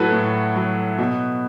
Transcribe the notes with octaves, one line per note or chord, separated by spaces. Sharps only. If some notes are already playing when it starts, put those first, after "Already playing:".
Already playing: A2 F#3 E4 F#4 A4 B4
A2
F#3
B2